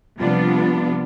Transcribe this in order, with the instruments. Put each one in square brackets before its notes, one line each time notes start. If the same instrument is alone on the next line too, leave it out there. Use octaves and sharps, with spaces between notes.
[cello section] C3 F3 G3 B3 D4 F4